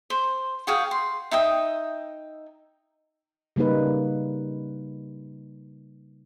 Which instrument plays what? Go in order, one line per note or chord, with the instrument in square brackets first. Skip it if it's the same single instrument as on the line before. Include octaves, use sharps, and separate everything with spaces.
[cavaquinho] C5
F#4 G#4 F5 G5
C6
D#4 E5 G5 D#6
[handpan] C#3 G3 A#3 D#4 B4